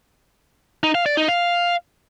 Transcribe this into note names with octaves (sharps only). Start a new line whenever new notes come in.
D#4
F5
D5
D#4
F5